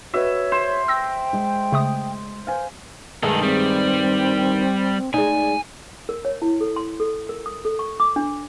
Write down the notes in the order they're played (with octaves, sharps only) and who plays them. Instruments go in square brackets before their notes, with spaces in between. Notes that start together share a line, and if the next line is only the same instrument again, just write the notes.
[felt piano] F#4 B4 [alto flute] C#5 [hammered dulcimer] E5
[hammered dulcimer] C5 [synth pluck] E7
[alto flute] G5 [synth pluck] E6 A#6
[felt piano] G#3
[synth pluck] C#3 A3 D#6
[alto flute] C5 [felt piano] F5 G#5
[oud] G2 D#3 G#3 [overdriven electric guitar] D#4 A4
[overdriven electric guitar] G3 [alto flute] C4
[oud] G#3 D#4 [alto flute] D5 [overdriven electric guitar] G#5
[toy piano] A#4
C#5
E4
A4
C6
A4
A#4
D#6
A4
C#6
D6
D4